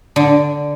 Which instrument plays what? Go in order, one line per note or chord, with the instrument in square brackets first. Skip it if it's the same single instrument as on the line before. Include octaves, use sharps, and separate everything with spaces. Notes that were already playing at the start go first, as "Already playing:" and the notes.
[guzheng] D3